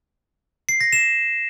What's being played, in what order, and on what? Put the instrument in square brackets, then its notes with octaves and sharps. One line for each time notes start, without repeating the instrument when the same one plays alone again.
[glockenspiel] C7
A#6
E7